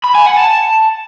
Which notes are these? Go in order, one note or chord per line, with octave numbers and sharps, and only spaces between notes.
B5
G#5
F#5
A5